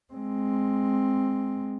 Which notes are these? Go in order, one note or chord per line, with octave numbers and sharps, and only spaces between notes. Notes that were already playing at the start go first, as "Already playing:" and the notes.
G#3 C4